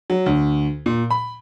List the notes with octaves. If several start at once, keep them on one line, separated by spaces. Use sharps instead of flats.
F#3
D2
A#2
B5